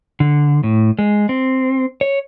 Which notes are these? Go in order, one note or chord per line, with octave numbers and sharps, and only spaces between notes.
D3
A2
G#3
C4
C#5